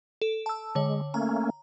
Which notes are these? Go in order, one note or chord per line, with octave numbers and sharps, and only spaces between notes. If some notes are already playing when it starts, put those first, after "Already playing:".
A4
A5 E6
D3 G#3 C#5
A3 A#3 C#4 A#5